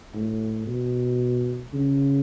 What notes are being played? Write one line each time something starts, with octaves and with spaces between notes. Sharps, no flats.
A2
B2
C#3